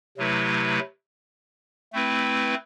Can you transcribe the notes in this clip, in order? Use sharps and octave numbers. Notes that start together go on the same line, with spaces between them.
C3 F#3 A3 E4 B4
A3 C4 E4 B4